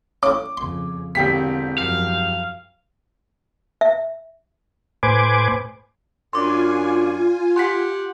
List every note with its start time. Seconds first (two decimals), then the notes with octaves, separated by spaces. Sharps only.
0.23 A2 C#4 D6
0.57 F2 C#3 C6
1.15 E1 D3 C4 G4 B6
1.78 F#2 F3 F5
3.81 E5
5.03 A2 B4 C5 G#5 D6
6.33 F#2 D4 F4 G#5 C6 D6
7.56 G4 F#5 C6 B6